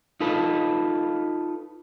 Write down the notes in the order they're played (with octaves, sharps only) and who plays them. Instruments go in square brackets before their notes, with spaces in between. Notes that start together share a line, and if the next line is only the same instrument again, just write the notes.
[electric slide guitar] D#4 F4 A4 B4